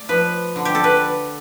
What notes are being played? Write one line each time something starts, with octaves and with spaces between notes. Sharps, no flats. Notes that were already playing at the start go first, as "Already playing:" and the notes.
Already playing: A3 D5
F3 B4
D3
G4
A4
B4